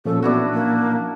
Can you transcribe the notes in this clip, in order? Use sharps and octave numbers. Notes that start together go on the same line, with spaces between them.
A#2 F3 C#4 A4
B3 D4 E4 F#4
A#3